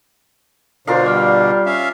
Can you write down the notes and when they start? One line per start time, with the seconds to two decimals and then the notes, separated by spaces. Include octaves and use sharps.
0.87 B2 D3 D4 F4 A#4 C5 F5 C7
1.06 G3 D6 F6
1.66 C#4 E5 F5